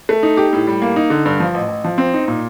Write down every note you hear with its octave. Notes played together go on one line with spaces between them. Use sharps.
A3
D#4
G4
A2
G3
A#3
D#4
D3
G2
F3
A1
A1
F3
C4
D#4
A#2